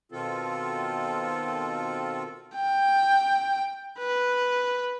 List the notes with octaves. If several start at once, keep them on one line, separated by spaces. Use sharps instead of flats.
B2 D#3 C4 F4 A4
G5
B4